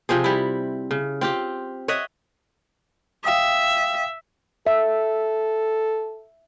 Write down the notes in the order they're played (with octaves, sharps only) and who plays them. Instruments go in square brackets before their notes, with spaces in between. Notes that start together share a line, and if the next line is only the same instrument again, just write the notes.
[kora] C3 F3 C4 G#4
G3 E4
C#3
C4 F4 G4
C#5 D#5 E5 F#5
[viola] E5 [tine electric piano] F5 G5 D#6
[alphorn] A4 [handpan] E5